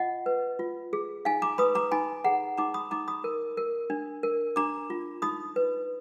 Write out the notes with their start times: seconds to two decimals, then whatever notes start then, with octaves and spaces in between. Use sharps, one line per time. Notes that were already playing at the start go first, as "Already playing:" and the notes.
Already playing: F4 D#5 F#5
0.26 B4
0.59 F4
0.93 G#4
1.25 D#4 F5 G#5
1.42 A#5 D6
1.58 B4 B5 D#6
1.75 A#5 D6
1.91 D#4 G#5 B5
2.24 G#4 F#5 A#5
2.58 D#4 A#5 D6
2.74 B5 D#6
2.91 D#4 A#5 D6
3.08 B5 D#6
3.24 A#4
3.57 A#4
3.90 D4
4.23 A#4
4.56 D4 A#5 D6
4.90 F4
5.22 D#4 B5 D#6
5.56 B4